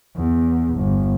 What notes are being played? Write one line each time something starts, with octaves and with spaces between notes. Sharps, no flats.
E2
G1